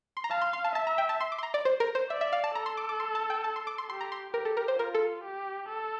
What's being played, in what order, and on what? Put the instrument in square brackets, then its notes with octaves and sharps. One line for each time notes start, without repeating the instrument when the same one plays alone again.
[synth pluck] C6
A#5
[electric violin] F5 [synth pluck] A5
[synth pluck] C6
C6
A5
[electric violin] E5 [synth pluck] A5
[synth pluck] A#5
G5
A5
C6
D6
C6
A#5
D5
C5
A#4
C5
[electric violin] D5 [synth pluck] E5
[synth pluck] E5
F5
A5
[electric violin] A4 [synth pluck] A#5
[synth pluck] C6
D6
D6
C6
A5
G5
A5
C6
D6
C6
[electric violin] G4 [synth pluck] C6
[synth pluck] A#5
C6
[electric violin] G4 [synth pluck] A#4
[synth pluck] A4
A#4
C5
[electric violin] F4 [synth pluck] A#4
[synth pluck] A4
[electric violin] G4
A4